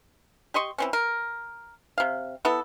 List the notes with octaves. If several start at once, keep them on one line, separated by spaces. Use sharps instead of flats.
G4 D#5 C6 C#6
E3 C4 C#4
A#4
C3 F5
B3 E4 A4